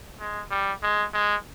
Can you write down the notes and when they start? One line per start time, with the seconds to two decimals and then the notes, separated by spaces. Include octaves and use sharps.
0.20 G#3
0.51 G3
0.83 G#3
1.14 G#3